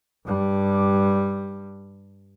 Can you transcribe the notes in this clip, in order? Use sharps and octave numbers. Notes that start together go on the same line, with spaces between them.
G2 G3